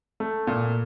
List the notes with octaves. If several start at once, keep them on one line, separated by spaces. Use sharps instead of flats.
A3
A#2